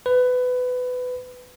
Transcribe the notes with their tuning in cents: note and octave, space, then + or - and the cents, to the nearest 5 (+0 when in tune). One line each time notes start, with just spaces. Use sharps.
B4 +20